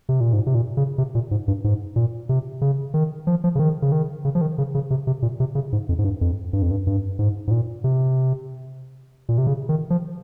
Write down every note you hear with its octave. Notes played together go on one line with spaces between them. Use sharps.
C3
A#2
G#2
C3
A#2
C#3
C3
A#2
G#2
G2
G#2
A#2
C3
C#3
D#3
F3
F3
C#3
D#3
C#3
D#3
C#3
F3
D#3
C#3
C#3
C3
C3
A#2
C3
C#3
G#2
F2
G#2
G2
F2
G2
F2
G2
G2
G#2
G#2
A#2
C3
A#2
C3
C#3
D#3
F3